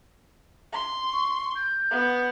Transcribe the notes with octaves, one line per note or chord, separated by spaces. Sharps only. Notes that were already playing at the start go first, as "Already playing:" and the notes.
C6
C#6
G6
B3